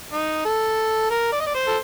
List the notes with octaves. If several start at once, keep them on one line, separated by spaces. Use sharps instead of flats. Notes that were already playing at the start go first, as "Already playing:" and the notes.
D#4
A4
A#4
D5
D#5
D5
C5
A4